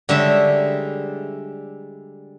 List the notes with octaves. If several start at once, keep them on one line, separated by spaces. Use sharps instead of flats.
D3 G3 G#3 C#5 E5